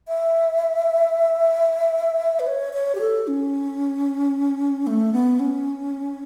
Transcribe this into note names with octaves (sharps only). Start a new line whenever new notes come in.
E5
B4
C#5
C#5
G4
A4
C#4
A3
B3
C#4